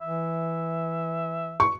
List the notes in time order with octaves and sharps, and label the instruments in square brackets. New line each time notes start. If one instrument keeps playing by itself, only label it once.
[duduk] E3 [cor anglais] E5
[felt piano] C#6